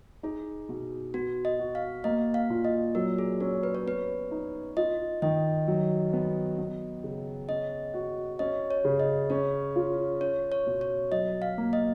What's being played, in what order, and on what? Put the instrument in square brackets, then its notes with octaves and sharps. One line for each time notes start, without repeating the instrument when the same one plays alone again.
[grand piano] D#4 [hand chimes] G#4
[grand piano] B2
[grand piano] B3 [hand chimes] F#4
[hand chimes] D#5
[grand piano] F#4
[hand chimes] F5
[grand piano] A#3 [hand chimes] D#5
[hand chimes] F5
[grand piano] A#2
[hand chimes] D#5
[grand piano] F#3 [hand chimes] A#4
[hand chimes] G#4
[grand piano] C#4 [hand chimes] A#4
[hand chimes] B4
C#5
[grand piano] B3 [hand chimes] B4
[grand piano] D#4
[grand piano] F4 [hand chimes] D#5
[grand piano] D#3 [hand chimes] D#5
[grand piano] F#3
B3
B3
C#3
[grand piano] C#4 [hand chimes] D#5
[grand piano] F#4
[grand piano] C#4 [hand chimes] D#5
[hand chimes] C#5
[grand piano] C#3
[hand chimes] D#5
[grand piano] C#4 [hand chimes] C#5
[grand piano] F4
[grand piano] C#4 [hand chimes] C#5
[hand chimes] C#5
[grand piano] B2
[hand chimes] C#5
[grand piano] F#3 [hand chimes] D#5
[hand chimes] F5
[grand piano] A#3
[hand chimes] D#5